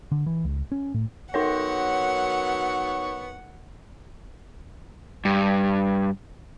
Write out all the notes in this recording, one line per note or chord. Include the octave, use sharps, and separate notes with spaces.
D3
E3
C#2
C#4
A2
F#3 B3 D#4 A#4 C#5 F#5 C#6
G2